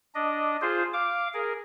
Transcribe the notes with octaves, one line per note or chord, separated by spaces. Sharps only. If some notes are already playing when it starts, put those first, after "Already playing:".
D4 D#5
F4 G#4 C5
F5 D6
G#4 A#4